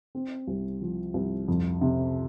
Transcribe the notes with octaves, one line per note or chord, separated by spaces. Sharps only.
C4
C2
F3
C2
F2
C3